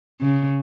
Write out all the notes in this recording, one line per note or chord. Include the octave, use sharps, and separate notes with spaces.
C#3